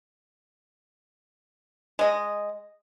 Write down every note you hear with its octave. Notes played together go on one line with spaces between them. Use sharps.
G#3 D#5